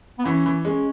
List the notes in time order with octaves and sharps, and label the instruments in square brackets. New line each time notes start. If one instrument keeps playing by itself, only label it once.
[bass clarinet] B3
[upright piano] E3 [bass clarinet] C#4
[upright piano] E3
[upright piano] G#3 [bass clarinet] C#4